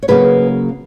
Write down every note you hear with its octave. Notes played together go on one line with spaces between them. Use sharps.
C#5
C#3 F#3 A#3 C#4 G#4 B4